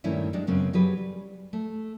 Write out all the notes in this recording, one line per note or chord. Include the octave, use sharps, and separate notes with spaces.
G2 A#2 D#3 A3 C#4 E4
G2 G#3 D4
F#2 C#3 B3 C4
F#3 G4 G#4 B4
G3
A3